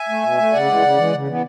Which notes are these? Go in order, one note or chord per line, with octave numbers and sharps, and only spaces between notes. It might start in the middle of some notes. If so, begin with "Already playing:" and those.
Already playing: E5 G#5
A3
B2
A3
C#3 D5 F#5
E3 G#3
C#3
E3 G#3
C#3
E3 B3